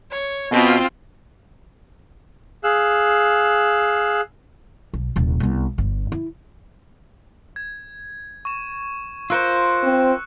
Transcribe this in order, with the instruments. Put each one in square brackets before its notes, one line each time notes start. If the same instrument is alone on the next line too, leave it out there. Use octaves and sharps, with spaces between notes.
[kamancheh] C#5
[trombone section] B2 [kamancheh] C4 F4
[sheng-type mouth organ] G#4 F5 E6 F#6
[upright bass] B1
D#1 C2
C2 B3
G1 G2
E4
[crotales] G#6
C#6 E7
[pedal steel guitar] F4 A#4 C5 [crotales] E6 F#6 C#7
[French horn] C4